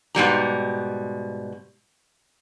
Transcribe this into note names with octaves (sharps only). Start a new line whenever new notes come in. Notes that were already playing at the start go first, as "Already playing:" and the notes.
G#2 B2 G3 A#5